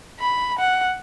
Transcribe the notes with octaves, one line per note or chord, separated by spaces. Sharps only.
B5
F#5